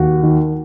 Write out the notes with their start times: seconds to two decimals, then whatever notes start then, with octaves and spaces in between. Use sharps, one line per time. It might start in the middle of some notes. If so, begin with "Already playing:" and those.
Already playing: D#2 F#4
0.23 D#3